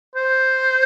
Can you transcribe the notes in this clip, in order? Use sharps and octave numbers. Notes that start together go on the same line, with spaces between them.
C5